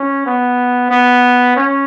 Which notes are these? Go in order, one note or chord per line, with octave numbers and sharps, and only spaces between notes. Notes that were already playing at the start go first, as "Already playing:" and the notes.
Already playing: C#4
B3
B3
C#4